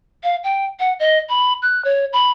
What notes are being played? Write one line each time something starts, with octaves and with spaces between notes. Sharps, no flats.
F5
G5
F#5
D#5
B5
F#6
C#5
B5